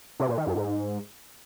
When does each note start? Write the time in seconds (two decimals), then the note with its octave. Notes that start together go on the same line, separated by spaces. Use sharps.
0.20 C3
0.29 A#2
0.38 D#3
0.47 F#2
0.56 G#2